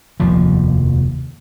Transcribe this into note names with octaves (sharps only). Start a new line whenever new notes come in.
F1 D#2 F3